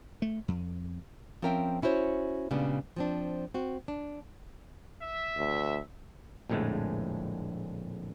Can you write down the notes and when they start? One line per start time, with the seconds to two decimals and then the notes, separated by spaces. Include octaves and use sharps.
0.22 A3
0.48 F2
1.42 F3 C4 C#4 A#4 E5 G5
1.82 C#4 E4 F#4 C5 C#5
2.51 A#2 C#3 G3 G#3 B3 D4
2.96 F3 C4 D4
3.54 C4 F#4
3.88 D4
5.02 E5
5.37 D2
6.49 A#1 F2 A2 D3 G#3 A3